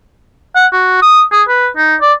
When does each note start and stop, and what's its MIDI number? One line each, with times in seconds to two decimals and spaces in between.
0.56 0.66 78
0.73 0.98 66
1.02 1.23 87
1.32 1.43 68
1.49 1.68 71
1.77 1.95 63
2.01 2.13 74